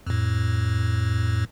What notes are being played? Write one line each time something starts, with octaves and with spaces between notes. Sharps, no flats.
F2 A2